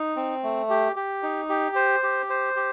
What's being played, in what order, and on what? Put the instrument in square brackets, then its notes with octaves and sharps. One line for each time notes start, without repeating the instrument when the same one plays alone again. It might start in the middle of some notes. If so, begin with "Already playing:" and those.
Already playing: [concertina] D#4
C4
A3
G4
G4
D#4
G4
C5
G4
C5
G4